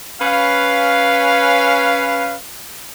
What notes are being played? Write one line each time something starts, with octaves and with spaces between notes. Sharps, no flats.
C#4 B4 F5